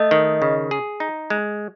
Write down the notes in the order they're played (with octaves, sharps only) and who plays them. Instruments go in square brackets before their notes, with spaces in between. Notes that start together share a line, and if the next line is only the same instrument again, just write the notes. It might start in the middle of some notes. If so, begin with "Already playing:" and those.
Already playing: [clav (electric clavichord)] A3 [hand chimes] D#5
[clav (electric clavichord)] D#3
C#3
G#4
D#4
G#3